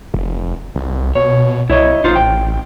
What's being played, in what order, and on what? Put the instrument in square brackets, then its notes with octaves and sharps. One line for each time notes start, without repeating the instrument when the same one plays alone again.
[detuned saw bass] F1
C2
[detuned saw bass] B2 [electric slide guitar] C#5
[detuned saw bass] C2 [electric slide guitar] E4 C#5 D#5
[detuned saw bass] A1 [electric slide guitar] D#4 F4 C5
[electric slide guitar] G5